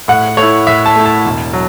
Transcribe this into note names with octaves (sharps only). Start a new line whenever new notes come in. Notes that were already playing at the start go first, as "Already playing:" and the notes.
A2 F#5
A3 C#5
E4
A2 E5
A5
A3 E4
A5
E1
F#3